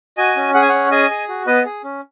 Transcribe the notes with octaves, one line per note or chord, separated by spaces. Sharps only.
F#4 D#5 G#5
C#4
G#4 F#5
G#5
C#4 C#5 F#5
G#4 D#5 G#5
G#4
F#4
B3 B4 D#5
G#4
C#4